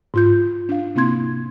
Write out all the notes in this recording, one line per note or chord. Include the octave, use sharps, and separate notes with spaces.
G#2 F4 G6
D4 F5
C3 A#3 C4 E4 C6 G#6